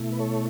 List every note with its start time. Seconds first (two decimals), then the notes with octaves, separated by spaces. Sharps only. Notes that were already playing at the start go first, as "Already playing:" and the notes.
Already playing: B2 A3 E4
0.12 B4
0.19 A4 C#5